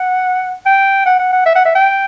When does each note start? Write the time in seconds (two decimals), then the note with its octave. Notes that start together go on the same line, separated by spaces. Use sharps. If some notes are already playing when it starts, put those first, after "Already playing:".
Already playing: F#5
0.66 G5
1.06 F#5
1.19 F#5
1.33 F#5
1.46 E5
1.56 F#5
1.65 E5
1.75 G5